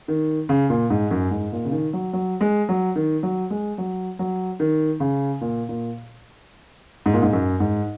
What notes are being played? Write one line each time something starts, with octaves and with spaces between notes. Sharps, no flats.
D#3
C#3
A#2
G#2
F#2
G#2
A#2
C#3
D#3
F#3
F#3
G#3
F#3
D#3
F#3
G#3
F#3
F#3
D#3
C#3
A#2
A#2
G#2
A#2
G#2
F#2
G#2